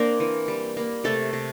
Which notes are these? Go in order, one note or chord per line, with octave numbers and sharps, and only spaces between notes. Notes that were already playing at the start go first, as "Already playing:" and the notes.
Already playing: A#3 C4 D4 A#4 C5 D5
E3
G3
A#3
C3 A3 A4
C3